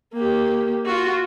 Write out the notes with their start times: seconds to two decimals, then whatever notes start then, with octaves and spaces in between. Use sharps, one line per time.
0.13 A#3 G4
0.86 F4 F#4